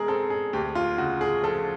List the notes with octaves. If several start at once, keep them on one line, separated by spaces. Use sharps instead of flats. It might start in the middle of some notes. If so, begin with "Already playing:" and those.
Already playing: B2 G#3 G#4 A#4
C4 A4
G#4
D2 G4
F4
C#3 F#4
G#4
F3 A4